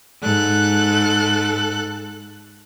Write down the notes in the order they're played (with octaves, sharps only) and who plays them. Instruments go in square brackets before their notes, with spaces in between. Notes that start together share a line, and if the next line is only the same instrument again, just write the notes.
[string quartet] G#2 A4 F#6